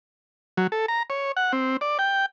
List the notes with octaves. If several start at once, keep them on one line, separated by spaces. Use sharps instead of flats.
F#3
A4
A#5
C#5
F#5
C4
D5
G5